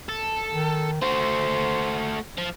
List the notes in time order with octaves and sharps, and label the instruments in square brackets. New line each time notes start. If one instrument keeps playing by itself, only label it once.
[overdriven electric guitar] A4
[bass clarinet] D#3
[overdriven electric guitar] A3 F#4 [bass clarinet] C5
[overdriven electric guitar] F3